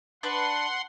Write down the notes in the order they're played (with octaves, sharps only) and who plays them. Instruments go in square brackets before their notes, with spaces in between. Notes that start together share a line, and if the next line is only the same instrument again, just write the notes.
[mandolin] D4 B4 [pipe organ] F#5 C6